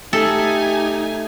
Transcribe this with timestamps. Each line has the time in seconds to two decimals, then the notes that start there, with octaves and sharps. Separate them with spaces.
0.13 A3 D#4 G4 A4 G#5